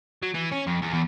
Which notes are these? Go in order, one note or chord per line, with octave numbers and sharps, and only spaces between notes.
F#3
E3
C#4
F2
E2
E2